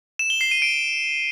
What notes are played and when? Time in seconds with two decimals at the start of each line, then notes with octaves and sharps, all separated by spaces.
0.19 E7
0.30 G7
0.41 C7
0.51 D#7
0.62 D7